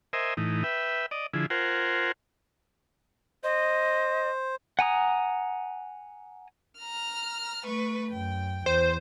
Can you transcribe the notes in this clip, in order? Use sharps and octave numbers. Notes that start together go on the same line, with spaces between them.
A#4 C5 D#5 E5 G#5
A2 E3 D#4
B4 E5 G5
D5 D#5
D3 F3 E4 G#4
F4 A#4 C5 F#5 G#5
C5 D#5
F#5 G#5 A#5 D#6
A#5 F6
A3 B4 C#6
F#2 G5
E2 C5